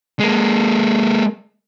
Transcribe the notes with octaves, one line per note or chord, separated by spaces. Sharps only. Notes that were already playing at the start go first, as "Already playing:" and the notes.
G#3 A#3